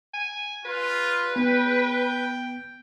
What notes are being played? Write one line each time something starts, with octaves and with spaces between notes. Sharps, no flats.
G#5
F4 B4
B3 G5